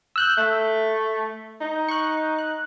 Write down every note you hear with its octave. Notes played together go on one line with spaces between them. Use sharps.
E6 F#6 G6
A3
D#4
C#6 F#6
F#6